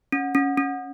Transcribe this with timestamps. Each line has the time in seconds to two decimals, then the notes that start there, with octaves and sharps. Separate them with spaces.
0.12 C#4
0.35 C#4
0.58 C#4